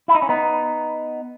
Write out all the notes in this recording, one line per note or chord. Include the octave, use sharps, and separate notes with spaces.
E4
D#4
C#4
B3 D#4